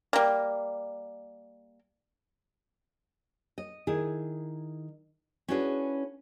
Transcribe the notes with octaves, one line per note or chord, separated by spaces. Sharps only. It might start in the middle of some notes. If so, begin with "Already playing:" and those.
G3 A#3
D#5
D#3 E4 G#4
C#4 D4 E4 F#4 G#4 B4